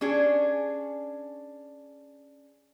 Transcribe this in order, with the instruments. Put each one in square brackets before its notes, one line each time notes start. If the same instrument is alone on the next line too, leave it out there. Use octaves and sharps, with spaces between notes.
[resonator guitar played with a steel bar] C#4 D4 G#4